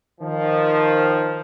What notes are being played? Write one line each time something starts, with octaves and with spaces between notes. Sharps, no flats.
D#3 F3